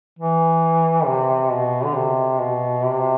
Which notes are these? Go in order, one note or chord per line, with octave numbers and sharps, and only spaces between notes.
E3
C3
B2
D3
C3
B2
C3